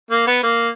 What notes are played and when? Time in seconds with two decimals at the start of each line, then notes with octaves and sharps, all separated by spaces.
0.11 A#3
0.27 B3
0.43 A#3